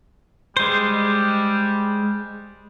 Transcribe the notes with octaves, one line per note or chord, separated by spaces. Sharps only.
G3 G#3 C5